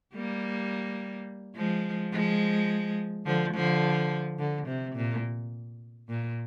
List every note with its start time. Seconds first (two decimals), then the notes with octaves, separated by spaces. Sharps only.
0.15 G3 A#3
1.56 F3 G#3
2.13 F3 G#3
3.26 D3 F3
3.54 D3 F3
4.39 D3
4.67 C3
4.96 A#2
6.09 A#2